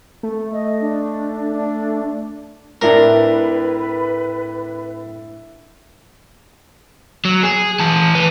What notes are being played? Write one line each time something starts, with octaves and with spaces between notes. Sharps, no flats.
A3
D#5
D4
D4
A2 C4 D4 E4 A#4 B4 D5
F#3
G#4
E3 A5
E3 B4